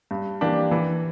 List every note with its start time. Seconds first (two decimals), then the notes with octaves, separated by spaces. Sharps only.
0.11 G2
0.41 E3 A#3 D4 G4
0.71 E3